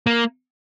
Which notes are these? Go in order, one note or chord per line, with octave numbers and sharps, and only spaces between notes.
A#3